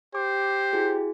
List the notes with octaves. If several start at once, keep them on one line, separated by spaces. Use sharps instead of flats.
G4 C5 D6
E4 F#4 G#4